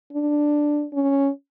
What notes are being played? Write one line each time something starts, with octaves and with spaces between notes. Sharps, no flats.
D4
C#4